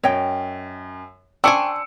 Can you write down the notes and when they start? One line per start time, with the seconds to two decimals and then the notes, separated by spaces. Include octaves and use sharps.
0.03 F#2 C#5 D#5 G5
1.44 D4 C5 G5 G#5 C#6 E6 C#7 D7